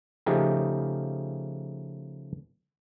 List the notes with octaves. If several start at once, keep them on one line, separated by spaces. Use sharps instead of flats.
C#3 F3 A3 D#4 G4 G#4